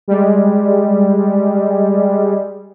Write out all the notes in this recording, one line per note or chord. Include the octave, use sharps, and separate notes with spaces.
G3 G#3